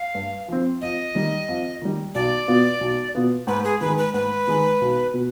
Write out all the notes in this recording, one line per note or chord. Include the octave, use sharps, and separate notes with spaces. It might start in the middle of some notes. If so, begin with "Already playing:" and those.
Already playing: F5
G2
F3 C4
F2 D#5
D#3 G3
F2
D#3 G3
B1 D5
B2 B3 F4
B1
B2 B3 F4
G#2 B4
G#4
D#3 B4
G#3
B4
G#2 B4
D#3 G#3
B1
B2